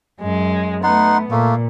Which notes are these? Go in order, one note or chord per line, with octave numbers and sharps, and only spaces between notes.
F#2 G#3
A3 B3 D#4 F#5 C6
A#2 A3 A#3